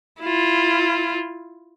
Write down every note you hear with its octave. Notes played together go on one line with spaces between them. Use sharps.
E4 F4